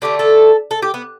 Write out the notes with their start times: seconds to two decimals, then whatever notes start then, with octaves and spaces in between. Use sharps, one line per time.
0.02 D3 A3 G4
0.19 A4
0.71 A4
0.82 G4
0.94 B3